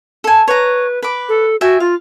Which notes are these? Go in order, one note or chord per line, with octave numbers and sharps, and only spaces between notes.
A4 G#5
B4 C#5 A#5
B4 D6
A4
F#4 E5 G5 G#5
F4 F5